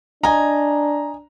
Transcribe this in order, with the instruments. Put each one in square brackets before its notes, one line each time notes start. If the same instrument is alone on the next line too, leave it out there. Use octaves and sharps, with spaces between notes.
[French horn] D4 [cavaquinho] D#5 G#5 [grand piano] A#5